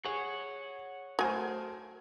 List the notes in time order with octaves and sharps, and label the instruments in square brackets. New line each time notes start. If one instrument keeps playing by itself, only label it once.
[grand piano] G#4 [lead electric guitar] C#5 F#5
[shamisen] F#3 G#5 [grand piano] A3 A#4 C5